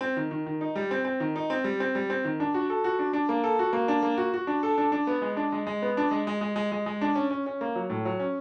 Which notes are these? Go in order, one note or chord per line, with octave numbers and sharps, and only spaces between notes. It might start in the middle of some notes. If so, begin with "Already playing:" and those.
C4
D#3
D#3
D#3
D#4
G3
C4
C4
D#3
D#4
C4
G3
C4
G3
C4
D#3
D4
F#4
A4
F#4
D4
D4
A#3
A4
F#4
A#3
D4
A#3
F#4
F#4
D4
A4
D4
D4
B3
G#3
D4
G#3
G#3
B3
D4
G#3
G#3
G#3
G#3
G#3
G#3
D4
C#4
C#4
C#4
A#3
F#3
A2
F#3
C#4